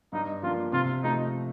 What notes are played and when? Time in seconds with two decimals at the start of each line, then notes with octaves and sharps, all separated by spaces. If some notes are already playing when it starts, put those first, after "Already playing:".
0.12 G2 D#4
0.43 F3 A#3 D4 F4
0.73 C3 F4
1.03 F3 A3 D#4